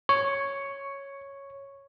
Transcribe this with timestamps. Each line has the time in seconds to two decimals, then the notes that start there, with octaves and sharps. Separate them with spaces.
0.09 C#5 C#6